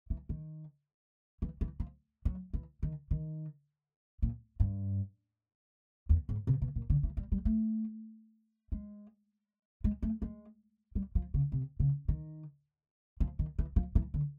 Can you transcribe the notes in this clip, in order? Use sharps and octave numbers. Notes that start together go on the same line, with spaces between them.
E3
D#3
E3
E3
F3
F#3
E3
D#3
D#3
A#2
G2
E2
G#2
C3
B2
A#2
D3
E3
G3
G3
A3
G#3
G#3
A3
G#3
G3
F3
C#3
C3
C#3
D#3
F3
D#3
E3
F3
E3
D3